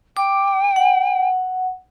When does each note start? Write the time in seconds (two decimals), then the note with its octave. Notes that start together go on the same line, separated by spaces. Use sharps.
0.17 G5 D6
0.76 F#5